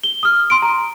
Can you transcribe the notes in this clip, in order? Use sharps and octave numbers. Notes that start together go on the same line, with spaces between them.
G7
D#6 F6
C6 D7
A#5